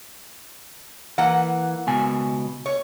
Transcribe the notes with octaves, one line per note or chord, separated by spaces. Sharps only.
E3 A#3 F#5
C#2 B2 G#5
C#5